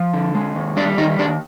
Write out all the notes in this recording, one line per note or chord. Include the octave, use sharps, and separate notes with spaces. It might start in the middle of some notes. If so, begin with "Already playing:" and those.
Already playing: F3
D3
G#3
D#2
G3 D4 D5
D#3 D#4 D#5
D#2 D4 D5